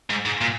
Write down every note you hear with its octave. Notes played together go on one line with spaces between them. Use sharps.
G#2
G#2
A#2